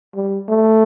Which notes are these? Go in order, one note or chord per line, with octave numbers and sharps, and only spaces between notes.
G3
A3